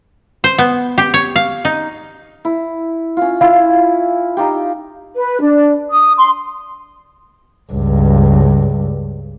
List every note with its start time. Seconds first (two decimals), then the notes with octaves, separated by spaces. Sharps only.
0.44 C5
0.58 B3
0.98 G4
1.14 C#5
1.36 F5
1.65 D#4
2.45 E4
3.17 C#4 F4
3.41 E4 F4 F5
4.37 D#4 F4 G4
5.15 B4
5.40 D4
5.91 D#6
6.18 C6
7.72 C#2 G2